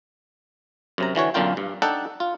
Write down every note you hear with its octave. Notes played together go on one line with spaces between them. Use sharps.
F#2 C3 A#5
D3 E3 F#4 C#5
B1 F#2 D3 A#3 F4 G5
G2
D4 D#4 A4 F#5 G5
F4